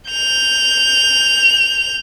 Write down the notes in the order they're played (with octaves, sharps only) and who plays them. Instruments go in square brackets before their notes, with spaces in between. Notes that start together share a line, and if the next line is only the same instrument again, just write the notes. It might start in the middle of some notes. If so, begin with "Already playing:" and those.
[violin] G6 F7